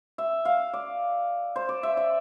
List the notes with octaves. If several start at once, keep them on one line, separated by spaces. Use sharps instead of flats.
E5
F5
D5
C5
D5
E5
D5